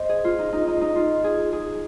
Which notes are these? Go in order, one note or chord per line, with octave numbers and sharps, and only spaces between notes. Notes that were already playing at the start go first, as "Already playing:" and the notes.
Already playing: C5 D#5
G#4
F4
D#4
D#4
D#4
D#4
F4
G#4
G#4